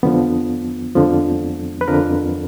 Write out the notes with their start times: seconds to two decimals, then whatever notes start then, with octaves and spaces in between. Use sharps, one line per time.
0.03 F2 D3 F3 B3
0.95 F2 D3 F3
1.81 B4
1.88 F2 D3 F3 A#4